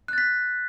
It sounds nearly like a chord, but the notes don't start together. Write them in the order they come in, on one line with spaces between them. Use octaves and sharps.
F#6 A6 B6